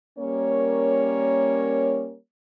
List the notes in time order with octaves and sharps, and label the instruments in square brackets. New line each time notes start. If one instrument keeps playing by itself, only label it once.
[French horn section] G3 A#3 C#4 A#4 C#5